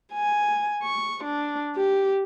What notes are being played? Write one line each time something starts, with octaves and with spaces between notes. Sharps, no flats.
G#5
C#6
D4
G4